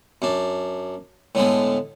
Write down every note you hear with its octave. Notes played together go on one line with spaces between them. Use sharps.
F#2 D4
A2 D3 G#3 B3